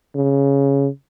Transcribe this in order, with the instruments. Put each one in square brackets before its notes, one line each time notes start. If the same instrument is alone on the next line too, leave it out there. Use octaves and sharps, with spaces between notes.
[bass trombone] C#3